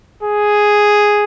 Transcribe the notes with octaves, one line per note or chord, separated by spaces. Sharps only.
G#4